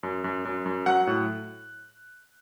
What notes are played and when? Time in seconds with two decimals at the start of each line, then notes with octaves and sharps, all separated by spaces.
0.03 F#2
0.24 F#2
0.45 F#2
0.66 F#2
0.86 F#3 F#5 F#6
1.07 A2